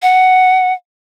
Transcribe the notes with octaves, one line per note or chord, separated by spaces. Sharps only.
F#5